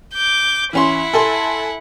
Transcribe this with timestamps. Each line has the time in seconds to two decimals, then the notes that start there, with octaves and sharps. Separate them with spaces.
0.14 D6 G6
0.73 E3 C#4 E4 F#5 C6
1.13 A4 G#5 C6